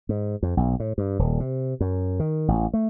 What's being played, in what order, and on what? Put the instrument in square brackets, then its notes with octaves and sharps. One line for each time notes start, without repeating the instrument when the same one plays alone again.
[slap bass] G#2
F2
B1
A2
G2
D#1
C3
F#2
D#3
A1
A3